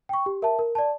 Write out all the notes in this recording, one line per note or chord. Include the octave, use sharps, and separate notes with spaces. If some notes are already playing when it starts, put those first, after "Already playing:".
G5 C#6
G4
A#4 E5 A5
A#4
D5 A5